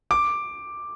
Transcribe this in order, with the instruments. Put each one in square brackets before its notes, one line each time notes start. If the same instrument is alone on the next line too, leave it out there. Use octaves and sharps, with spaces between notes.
[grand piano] D6